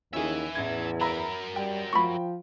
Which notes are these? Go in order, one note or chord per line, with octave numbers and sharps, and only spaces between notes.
D#2 C#4 E4 G#4 E5 G#5
A1 E2 G#6
F#3 A#4 E5 A#5 B5
G3 G5
F3 B5 C#6